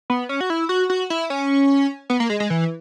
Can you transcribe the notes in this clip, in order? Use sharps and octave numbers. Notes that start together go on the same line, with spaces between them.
B3
C#4
F#4
E4
F#4
F#4
E4
C#4
B3
A#3
G#3
G#3
E3